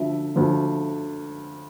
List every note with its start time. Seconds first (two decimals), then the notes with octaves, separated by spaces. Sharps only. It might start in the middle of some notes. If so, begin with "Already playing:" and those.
Already playing: D2 D3 F3 E5
0.36 D2 D3 F3